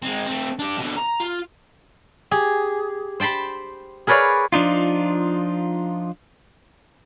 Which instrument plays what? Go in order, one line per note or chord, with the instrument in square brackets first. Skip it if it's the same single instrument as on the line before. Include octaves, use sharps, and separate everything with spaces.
[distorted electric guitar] G#3 C4
A3 C4
D4 G4
B2 D3
A#5
F4
[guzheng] G4 G#4
C5 G5 A5 B5 C6
G#4 A#4 B4 C#5 D5 F5
[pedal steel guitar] F3 D4 D#4 F4